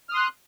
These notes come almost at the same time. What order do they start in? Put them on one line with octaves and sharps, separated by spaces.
F6 D#6 C6 F#6